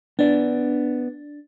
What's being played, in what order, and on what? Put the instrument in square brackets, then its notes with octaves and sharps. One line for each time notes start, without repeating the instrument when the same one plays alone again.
[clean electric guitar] B3 D5 [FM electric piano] D4